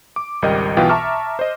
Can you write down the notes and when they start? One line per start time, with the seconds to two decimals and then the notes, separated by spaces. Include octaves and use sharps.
0.16 D6
0.42 G#1 C#2 G3 A#4 D#5 G5
0.77 B1 B2 E3 F4 G5
0.89 E5 A5 A#5 C#6 D6 F6
1.39 C5 D#5